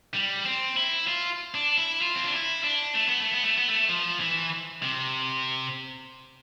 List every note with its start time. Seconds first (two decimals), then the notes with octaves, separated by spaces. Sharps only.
0.14 G3
0.45 C4
0.77 E4
1.08 F4
1.55 D4
1.78 E4
2.02 F4
2.15 C4
2.25 D4
2.33 E4
2.64 D4
2.95 A3
3.07 B3
3.20 A3
3.32 B3
3.44 A3
3.56 B3
3.68 A3
3.89 F3
4.20 E3
4.83 C3